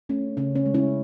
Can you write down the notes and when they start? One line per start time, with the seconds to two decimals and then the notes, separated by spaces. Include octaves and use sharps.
0.09 A3 C#4
0.37 C#3 C#4
0.55 C#4
0.66 G#3
0.74 C#4 E4